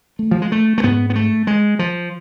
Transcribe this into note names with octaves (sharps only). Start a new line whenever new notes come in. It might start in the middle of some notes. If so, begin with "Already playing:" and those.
A3
F3
G#3
A3
A3
G#2 B3
B3
A3
G#3
F3